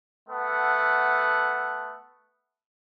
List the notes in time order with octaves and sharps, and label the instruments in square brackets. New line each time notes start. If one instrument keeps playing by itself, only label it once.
[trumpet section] A3 B3 A4 F#5